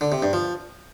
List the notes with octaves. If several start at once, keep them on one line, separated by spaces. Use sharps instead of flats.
D3
C3
G2
F3